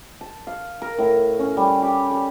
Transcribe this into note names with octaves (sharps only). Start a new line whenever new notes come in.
A5
F5
A#4
A2
C#4
G3
G4
A4